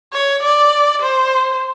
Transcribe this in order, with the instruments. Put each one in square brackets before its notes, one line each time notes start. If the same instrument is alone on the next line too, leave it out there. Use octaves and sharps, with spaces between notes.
[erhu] C#5
D5
C5